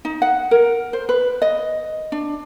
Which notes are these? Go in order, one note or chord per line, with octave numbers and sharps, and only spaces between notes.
D#4
F#5
A#4
C5
B4
D#5
D4